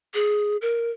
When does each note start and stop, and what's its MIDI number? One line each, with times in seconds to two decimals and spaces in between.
0.14 0.57 68
0.62 0.90 70